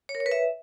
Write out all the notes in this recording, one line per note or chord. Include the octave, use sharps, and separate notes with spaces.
C#5
A#4
C#5
B4
E5